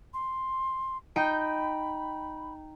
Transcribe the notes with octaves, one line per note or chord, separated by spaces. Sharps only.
C6
D#4 G5 B5